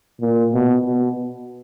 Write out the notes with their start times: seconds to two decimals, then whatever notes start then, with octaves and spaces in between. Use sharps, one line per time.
0.21 A#2
0.54 B2
0.86 B2